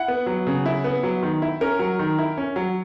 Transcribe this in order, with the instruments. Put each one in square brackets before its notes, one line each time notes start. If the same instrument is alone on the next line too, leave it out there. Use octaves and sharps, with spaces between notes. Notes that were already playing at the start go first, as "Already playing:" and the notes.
Already playing: [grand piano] E4 F#5
B3
F#3
C#3
E4
B3
F#3
D#3
E4
C#4 A#4
F#3
D#3
E4
C#4
F#3